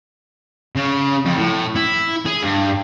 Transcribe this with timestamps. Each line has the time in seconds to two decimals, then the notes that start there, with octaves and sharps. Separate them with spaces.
0.76 C#3
1.26 F2
1.37 A2
1.76 E4
2.26 G#4
2.43 G2